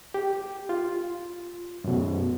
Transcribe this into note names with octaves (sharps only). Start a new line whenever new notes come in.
G4
F4
F#2 B2